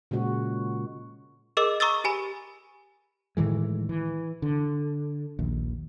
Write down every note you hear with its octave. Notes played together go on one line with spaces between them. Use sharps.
A#2 C#3 G#3 F#4
G#4 A#4 D#5 D6 E6
A#5 C#6 D#6 E6 A6
G4 G#5 B5
A2 D#3 E3 G#3
E3
D3
A#1 D#2